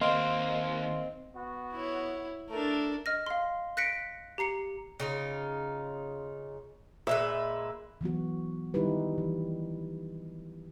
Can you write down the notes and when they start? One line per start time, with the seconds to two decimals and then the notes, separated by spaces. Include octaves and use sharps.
0.01 D#2 A#3 C4 D#5 F5 C6
1.35 B3 F#4
1.72 E4 C#5
2.50 A3 D4 A4 A#4
3.06 D#5 F6 A#6
3.26 F5 C6
3.77 F#6 A#6 B6 C#7 D7
4.38 G4 A#5 C7 C#7
5.00 C#3 D#4 F4
7.07 A#2 G#3 B4 E5
8.01 E3 F#3 B3 F#4
8.74 D#3 G3 D#4 E4 G4 B4
9.18 E3